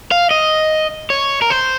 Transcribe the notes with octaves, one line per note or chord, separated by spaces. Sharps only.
F5
D#5
C#5
A#4
C5